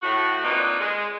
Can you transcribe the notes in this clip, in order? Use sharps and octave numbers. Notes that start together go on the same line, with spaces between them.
A2 F#4
A#3 C4 D4 D#4 F4 B4
G#3